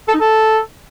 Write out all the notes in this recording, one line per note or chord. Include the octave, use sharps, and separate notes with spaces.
A4
D#4
A4